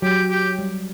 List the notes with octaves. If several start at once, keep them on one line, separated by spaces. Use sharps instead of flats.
F#3 G4
G4
G3